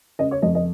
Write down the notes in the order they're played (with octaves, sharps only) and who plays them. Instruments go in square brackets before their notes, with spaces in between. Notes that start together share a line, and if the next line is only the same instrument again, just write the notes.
[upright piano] C#3 D#5
C#5
F2 D#5
D#5